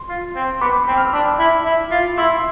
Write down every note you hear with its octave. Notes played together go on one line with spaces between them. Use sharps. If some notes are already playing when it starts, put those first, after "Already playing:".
Already playing: C6
F4
C4
B3 B5 D6
C4 G5 B5
F6
E6
D4 B5 D6
E4
E4
F4
E4 C6 E6